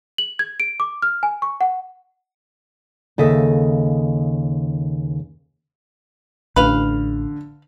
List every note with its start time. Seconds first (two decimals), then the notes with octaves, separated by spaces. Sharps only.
0.18 F#7
0.39 G#6
0.60 D7
0.80 D6
1.02 F6
1.23 G#5
1.42 C#6
1.61 F#5
3.18 D#2 C#3 A4 D#5 E5
6.56 A1 D3 B4 F5